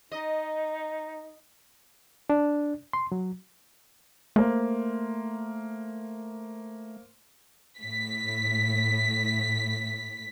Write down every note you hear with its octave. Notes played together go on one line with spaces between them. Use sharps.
D#4 D#5
D4
C6
F#3
A3 A#3 C5
A2 B6